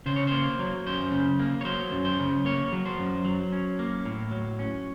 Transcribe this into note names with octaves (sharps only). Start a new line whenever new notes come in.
C#3 C5
C#5
A#3 C5
F#3
F#2 C5
C#3
A#3
C#5
F#3 C5
F#2
C5
C#3
A#3 C#5
F#3
C5
F#2
F#3
C#4
A#3
A2
F#3
C#4